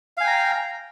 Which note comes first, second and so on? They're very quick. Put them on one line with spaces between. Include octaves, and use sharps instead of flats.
F5 G#5 G5 A#5